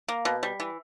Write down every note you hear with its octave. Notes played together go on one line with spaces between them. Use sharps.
A#3
B2
G3
E3